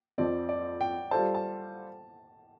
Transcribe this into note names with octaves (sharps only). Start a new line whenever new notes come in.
F2 F3 C4 D5
D5
G5
G3 F4 A4 C5 A5
A5